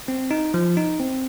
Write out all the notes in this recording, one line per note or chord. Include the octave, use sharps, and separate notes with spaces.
C4
D#4
F3
D#4
C4